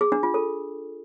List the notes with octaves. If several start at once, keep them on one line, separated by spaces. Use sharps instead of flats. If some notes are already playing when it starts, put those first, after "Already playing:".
G#4
D4
F4
A4